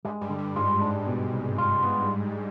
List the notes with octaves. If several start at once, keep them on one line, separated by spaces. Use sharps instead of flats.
G2 G3 G#3
G2 G3
D3
G2 G3
G#2 G#3 F4
G2 G3 D4
B2
C2
F4
B3